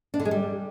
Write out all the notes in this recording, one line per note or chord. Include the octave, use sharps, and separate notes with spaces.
D4
D3
G#3
G3